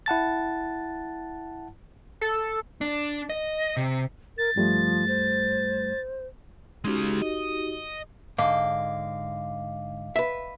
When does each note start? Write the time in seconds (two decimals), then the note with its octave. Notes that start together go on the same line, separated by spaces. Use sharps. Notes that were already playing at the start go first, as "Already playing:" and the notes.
0.06 E4 F#5 A5 A6
2.21 A4
2.81 D4
3.30 D#5
3.77 C3
4.38 A#4 A6
4.56 G2 F3 G3 A3
5.08 C5
6.85 G#3 C#4 D#4 F#4 G4
7.22 D#5
8.38 G#2 D3 D#5 F5 D6
10.16 B4 E5